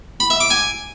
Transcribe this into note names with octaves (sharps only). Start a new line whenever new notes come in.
B5
E5
D6
G#5